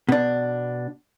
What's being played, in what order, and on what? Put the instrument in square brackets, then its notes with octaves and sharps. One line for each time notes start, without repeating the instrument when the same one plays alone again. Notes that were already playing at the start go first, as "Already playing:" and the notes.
[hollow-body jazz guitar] B2 D4